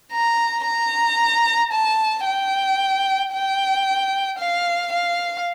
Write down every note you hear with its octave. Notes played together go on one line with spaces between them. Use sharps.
A#5
A#5
A5
G5
G5
F5
F5